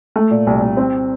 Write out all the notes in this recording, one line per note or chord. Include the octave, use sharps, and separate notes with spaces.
A3
A#2
C2
C2
C4